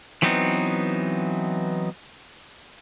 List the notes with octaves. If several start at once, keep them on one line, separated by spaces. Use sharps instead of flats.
E3 F#3 B3 C4 D#4